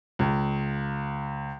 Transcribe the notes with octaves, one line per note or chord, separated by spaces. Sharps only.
C#2